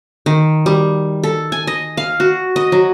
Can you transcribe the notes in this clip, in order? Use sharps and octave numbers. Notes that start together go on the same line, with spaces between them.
D#3
G3
A4
G#5
D#5
F5
F#4
D#5
F#3